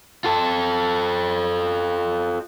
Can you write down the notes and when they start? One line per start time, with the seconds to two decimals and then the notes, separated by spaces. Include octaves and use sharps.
0.24 F4 A4